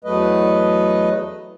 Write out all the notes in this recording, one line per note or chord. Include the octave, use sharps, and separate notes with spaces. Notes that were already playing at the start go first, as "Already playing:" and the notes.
E2 F#3 A3 B4 D#5